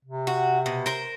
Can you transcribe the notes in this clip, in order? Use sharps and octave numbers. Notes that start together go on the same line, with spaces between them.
C3
F#4
B2
A#4 C5